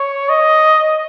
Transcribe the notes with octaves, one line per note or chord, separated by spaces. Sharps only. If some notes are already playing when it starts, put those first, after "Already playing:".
Already playing: C#5
D#5